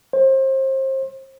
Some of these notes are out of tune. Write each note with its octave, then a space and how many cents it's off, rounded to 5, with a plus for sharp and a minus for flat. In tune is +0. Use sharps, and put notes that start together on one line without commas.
C5 +30